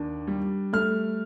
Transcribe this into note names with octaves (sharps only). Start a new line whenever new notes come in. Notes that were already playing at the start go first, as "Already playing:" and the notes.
Already playing: D#2 D4
G3
A3 F6